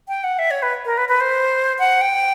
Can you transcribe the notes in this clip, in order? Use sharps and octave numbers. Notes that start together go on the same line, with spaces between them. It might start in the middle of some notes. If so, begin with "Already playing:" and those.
G5
F#5
E5
C#5
B4
A#4
B4
B4
C5
F#5
G5